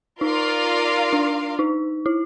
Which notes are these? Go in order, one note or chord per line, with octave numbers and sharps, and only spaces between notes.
D#4 F4 A#4 D5 F5
D4
D#4
E4